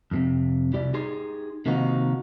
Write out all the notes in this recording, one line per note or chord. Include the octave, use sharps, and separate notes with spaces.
F2 A2 C3
C2 E4 G4 D5
D#4 G4 G#4 C6
C3 D#3 F3 A#3 D#4 F#4